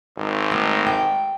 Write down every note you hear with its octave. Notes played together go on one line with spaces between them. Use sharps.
G#1
A3
G5